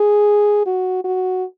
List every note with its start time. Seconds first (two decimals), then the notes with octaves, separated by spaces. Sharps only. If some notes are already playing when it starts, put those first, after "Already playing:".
Already playing: G#4
0.66 F#4
1.04 F#4